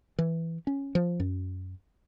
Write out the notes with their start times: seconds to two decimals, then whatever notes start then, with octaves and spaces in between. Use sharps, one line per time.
0.19 E3
0.67 C#4
0.95 F3
1.20 F#2